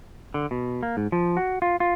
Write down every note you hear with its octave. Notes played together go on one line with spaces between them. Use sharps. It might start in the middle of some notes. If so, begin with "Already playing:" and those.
D3
B2
A#3
G#2
F3
F#4
F4
F4